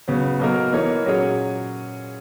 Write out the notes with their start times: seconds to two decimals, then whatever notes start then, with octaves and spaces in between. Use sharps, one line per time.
0.08 C#3 F#3 B3
0.39 B2 F#3 A#3 D#4 A#4
0.72 E3 A#3 D#4 A#4 C#5
1.05 A#2 F#3 C#4 G#4 C#5